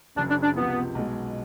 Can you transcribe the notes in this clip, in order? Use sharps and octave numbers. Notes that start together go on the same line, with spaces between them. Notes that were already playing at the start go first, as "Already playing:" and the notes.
F#1 F#2 C#3 D4
D4
D4
C#2 C3 F3 B3
B1 B2 G#3